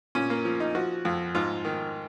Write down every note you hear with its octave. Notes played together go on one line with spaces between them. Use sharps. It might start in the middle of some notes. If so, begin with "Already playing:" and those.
A#2 C#4
A#3
F3
D#4
F3 F#4
F2
G#2 F4
D#3